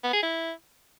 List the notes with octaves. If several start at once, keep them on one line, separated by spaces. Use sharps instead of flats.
B3
G#4
E4